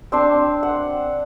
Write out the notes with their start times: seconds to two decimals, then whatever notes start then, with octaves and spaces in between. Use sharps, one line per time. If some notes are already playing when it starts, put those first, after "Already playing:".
0.12 C4 D4 C6
0.63 F#5